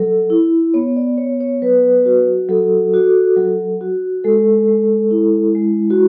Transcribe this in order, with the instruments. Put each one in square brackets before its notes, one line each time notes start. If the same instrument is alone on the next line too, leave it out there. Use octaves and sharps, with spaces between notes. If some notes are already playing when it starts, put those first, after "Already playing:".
Already playing: [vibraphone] F#3 A4
E4
B3 C#5
D5
B3 C#5
C#5
F#3 B4
F#4
F#3 A4
F#4
F#3
F#4
G#3 A4
G#3
E4
G#3
F#4